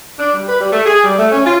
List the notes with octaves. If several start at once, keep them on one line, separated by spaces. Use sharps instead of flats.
D4
G3
B4
G3
A3
G#4
G3
A3
C#4
F4